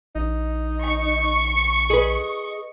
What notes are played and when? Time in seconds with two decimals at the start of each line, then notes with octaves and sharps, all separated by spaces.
0.15 A#1 D#4
0.83 C#6
1.90 G#4 B4 D#5